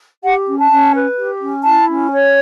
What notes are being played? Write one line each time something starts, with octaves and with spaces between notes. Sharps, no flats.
G4 F#5
C#4
A5
C#4
B4
G4
C#4
E4 A5
C#4
C#5